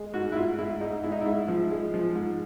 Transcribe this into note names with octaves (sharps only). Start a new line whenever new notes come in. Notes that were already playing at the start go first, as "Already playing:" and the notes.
Already playing: G#3
G#2 F#4
E4
G#2 F4
G#2 E4
G#2 D#4
G#2 E4
D#4
E4
G#2
F3
G#3
F3
G#2